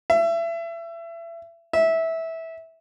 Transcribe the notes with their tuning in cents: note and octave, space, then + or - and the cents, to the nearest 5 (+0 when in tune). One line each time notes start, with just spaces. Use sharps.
E5 +30
E5 -15